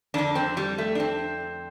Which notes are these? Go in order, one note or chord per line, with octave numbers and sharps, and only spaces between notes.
F2 D3 D4
C4
G3
A3
D4
C4